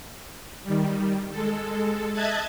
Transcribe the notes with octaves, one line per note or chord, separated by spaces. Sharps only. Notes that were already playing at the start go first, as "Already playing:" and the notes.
D#3 G3
G#3 A4
D#5 E5 A5 F#6 G#6 A6